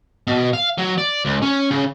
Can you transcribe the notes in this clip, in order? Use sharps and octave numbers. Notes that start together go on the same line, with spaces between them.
B2
F5
F#3
D5
C#2
C#4
C#3